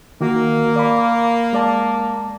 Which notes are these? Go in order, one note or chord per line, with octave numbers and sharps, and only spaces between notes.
D#3 A#3 F#4
D5 F5 B5
G#3 D5 A5